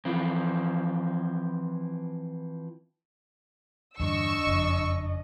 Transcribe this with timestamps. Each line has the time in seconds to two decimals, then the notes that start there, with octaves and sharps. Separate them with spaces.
0.05 E3 F3 C4
4.00 E2 G2 D3 D4 D#5 C#6 E6
4.47 F#1 F2